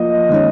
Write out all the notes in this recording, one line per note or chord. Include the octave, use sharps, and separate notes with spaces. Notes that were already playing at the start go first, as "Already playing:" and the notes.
Already playing: F3 A#3 F4 D#5
D#3 G#3 C#4